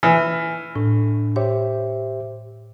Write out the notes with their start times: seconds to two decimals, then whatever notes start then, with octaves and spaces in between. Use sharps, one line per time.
0.03 E3 F6
0.76 A2 D4
1.36 G4 C5 C#5 E5